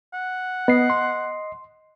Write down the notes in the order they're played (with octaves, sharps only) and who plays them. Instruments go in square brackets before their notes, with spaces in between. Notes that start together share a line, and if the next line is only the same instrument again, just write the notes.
[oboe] F#5
[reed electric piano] B3 [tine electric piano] D#5 C7
[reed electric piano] C6